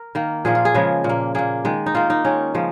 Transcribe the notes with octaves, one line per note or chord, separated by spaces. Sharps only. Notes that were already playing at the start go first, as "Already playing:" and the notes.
Already playing: A#4
D#3 A#3
A#2 F3 A#3 G#4
F4
G#4
C#3 F3 G#3
A#2
A#3
A#2 A#3 G#4
D#3 G#3
D#4
D#3 A#3 F4
D#4
D#3 G#3 C#4
C#3 F3 G#3